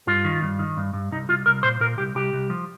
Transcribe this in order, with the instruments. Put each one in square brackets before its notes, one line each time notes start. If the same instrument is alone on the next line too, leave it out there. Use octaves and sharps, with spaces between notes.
[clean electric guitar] G2 F4
D#3
G2
D#3
G2
G2
C2 D#4
C2 F4
C2 A#4
A#2 C5
A#2 A#4
C2 G4
C2 G4
C2
F3